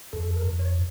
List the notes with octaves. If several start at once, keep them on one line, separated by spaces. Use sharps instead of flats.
F2 A4
A4
A#4
F2
C#5